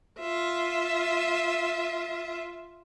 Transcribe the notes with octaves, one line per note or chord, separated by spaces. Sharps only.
F4 E5